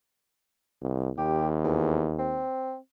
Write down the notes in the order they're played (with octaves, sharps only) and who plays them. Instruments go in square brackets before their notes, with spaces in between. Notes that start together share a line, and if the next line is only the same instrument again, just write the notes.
[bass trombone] C2
[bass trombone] D#2 [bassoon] G4
[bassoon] E2
C4